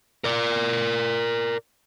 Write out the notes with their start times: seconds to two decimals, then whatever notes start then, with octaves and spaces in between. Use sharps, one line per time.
0.24 A#4 D5